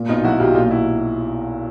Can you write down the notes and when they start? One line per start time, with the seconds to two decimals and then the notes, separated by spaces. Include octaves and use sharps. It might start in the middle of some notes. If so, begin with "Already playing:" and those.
Already playing: A#2
0.09 B1 D#4 F4
0.24 F#3 E4 F#4
0.40 B1 F4 G4
0.55 A#2 D#4 F4
0.71 E4 F#4